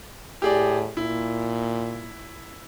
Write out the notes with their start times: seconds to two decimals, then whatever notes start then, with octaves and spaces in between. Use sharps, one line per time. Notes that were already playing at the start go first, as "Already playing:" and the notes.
0.42 A2 G4 G#4 D5
0.97 A#2 E4